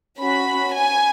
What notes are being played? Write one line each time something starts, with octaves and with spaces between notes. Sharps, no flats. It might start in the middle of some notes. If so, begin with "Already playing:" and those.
C#4 F#4 B5
G#5